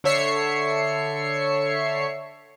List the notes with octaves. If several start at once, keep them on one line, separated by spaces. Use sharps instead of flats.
D3 A4 C#5 E5 C7 C#7